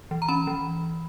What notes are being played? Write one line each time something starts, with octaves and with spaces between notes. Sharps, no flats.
E3
A#5
C#4 B5
E3